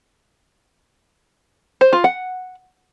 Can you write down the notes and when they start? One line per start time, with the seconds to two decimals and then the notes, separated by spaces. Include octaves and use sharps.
1.81 C5
1.93 F4
2.04 F#5